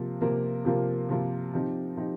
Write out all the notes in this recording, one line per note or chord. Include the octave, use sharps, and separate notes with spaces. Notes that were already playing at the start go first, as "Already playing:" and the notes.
Already playing: C3 F3 A#3 F4 A#4
C3 F3 A#3 F4 A#4
C3 F3 A#3 F4 A#4
C3 F3 A#3 F4 A#4
F3 C4 D#4 G4
F3 C4 D#4 G4